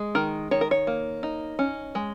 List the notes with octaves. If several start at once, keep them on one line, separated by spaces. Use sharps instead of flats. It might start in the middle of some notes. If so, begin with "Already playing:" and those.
Already playing: G#3
D#3 A#4
D#3 C#5
A#4
C#5
A#3
D#4
C#4
G#3